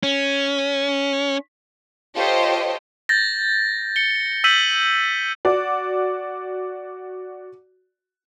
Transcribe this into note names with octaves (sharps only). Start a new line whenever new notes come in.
C#4
F4 G4 A4 C5 C#5 D#5
G6 A6 A#6
C#7 G7
E6 G6 B6 D#7 F#7
F#4 D5